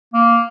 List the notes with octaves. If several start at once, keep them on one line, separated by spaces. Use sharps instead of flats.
A#3